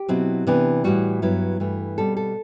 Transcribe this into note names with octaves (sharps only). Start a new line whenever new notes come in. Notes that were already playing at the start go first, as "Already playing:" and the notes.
Already playing: G4
B2 F#3 C4 E4
C3 E3 B3 D4
A2 E3 G3 F#4
G2 F#3 B3 E4
G2 E3 A3
B2 G3 C4 A4
A4